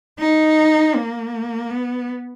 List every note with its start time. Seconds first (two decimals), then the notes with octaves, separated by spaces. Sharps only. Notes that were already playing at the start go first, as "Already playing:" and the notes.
0.19 D#4
0.95 A#3
1.70 B3